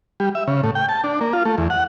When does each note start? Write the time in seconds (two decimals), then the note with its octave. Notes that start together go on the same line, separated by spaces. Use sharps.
0.20 G3
0.35 E5
0.47 C#3
0.63 A2
0.75 G5
0.89 A5
1.04 D4
1.21 A#3
1.33 F4
1.45 A3
1.58 E2
1.70 F#5